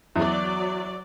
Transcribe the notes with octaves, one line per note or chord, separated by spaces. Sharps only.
E2 F#3 D5